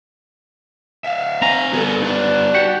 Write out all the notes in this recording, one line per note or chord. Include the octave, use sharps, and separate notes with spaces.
E5 F5
C4 G#5 A#5
G3 B3 G#4 A4
D#4 D5
F#4 G4 F#5